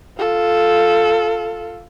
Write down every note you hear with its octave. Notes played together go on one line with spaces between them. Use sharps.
F4 A4